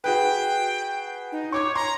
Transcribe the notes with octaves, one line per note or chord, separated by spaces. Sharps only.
F#4 G#4 B4 G5
D#4
C#5 C#6 D6 G#6
A#5 C6